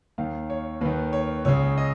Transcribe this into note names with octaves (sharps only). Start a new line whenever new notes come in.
D#2 D#3 F5
C#5
D#2 D#3 B4
C#5
C#2 C#3 C#5
D#5